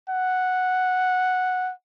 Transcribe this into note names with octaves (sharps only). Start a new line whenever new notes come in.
F#5